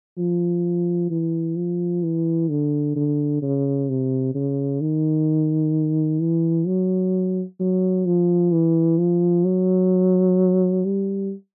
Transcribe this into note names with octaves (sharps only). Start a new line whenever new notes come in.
F3
E3
F3
E3
D3
D3
C#3
C3
C#3
D#3
E3
F#3
F#3
F3
E3
F3
F#3
G3